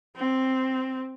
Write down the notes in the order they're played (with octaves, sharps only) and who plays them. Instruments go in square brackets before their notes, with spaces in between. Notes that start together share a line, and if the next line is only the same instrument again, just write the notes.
[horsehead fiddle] C4